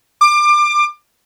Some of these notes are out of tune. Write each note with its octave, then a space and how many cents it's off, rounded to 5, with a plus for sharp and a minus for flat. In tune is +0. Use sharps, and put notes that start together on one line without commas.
D6 +25